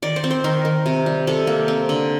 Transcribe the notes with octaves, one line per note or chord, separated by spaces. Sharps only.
D#3 D5
C5
C4
C5
D#3 A#4
D#3
C3
G3
C3 A4
A#3
C4
D3